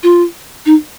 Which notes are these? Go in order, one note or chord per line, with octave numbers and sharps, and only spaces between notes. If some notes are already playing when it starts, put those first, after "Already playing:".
F4
D#4